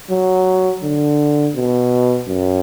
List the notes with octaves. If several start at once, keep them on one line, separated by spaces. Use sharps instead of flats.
F#3
D3
B2
F#2